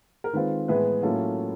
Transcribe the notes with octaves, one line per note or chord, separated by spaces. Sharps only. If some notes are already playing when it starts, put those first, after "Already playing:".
A#4
D#3 G#3 C4 F4 B4
A2 E3 G#3 B3 E4 B4
A2 F#3 A#3 C#4 F4 A4